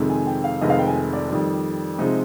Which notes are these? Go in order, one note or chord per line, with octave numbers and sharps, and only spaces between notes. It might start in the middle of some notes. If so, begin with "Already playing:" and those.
Already playing: F2 C3 D#3 G#3
G#5
G5
F5
F1 F2 C3 D#3 G#3 D#5
F5
G5
G#5
D5
F2 D#3 G3
C3 F3 G#3 D#4